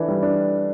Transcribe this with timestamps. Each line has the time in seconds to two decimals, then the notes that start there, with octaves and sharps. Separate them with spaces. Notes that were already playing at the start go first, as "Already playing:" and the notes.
Already playing: E3 D4 A4
0.08 G3
0.22 D4